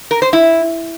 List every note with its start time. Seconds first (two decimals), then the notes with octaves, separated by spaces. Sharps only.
0.11 A#4
0.22 C5
0.33 E4